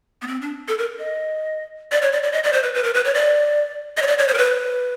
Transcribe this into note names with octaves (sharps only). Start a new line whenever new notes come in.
B3
C4
D4
A4
A#4
D#5
D5
C#5
D5
D5
D#5
D5
C5
B4
B4
A#4
B4
C#5
D5
D#5
C#5
D5
C#5
C5
A#4
B4